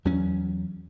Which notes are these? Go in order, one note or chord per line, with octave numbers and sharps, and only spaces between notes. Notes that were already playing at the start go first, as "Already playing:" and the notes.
E2 F#3 C#4